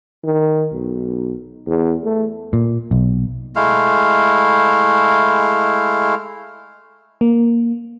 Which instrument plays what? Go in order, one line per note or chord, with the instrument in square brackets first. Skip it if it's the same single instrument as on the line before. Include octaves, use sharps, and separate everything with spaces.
[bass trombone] D#3
B1
E2
A3
[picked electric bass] A#2
B1
[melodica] G#3 A3 E4 F5
[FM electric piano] A#3